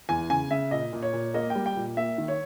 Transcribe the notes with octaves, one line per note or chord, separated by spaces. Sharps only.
E2 G#5
C#3 G#5
C#3 E5
A#2 D#5
A#2
C#5
A#2
A#3 D#5
G5
G3
G5
A#2
A#3 E5
D#3
C#5